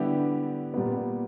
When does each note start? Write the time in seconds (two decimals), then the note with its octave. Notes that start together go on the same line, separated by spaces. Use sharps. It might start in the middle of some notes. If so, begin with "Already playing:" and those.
Already playing: D3 G3 B3 E4 G4
0.74 A#2 G3 B3